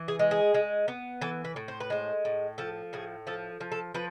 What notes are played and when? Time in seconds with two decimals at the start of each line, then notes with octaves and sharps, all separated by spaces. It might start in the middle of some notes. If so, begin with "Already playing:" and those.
Already playing: E3
0.08 G#4
0.19 G#3
0.31 G#4
0.54 G#3
0.88 B3
1.21 E3 A4
1.44 B4
1.56 A2
1.68 C5
1.80 B4
1.90 G#3 C5
2.25 A2
2.58 F3 A4
2.93 A2 G#4
3.27 F3 A4
3.61 F3
3.72 A4
3.94 F3 B4